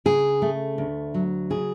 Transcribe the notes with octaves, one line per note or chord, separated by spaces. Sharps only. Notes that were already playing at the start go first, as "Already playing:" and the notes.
C#3 G#4
A3
D2
F#3
C#3 G#4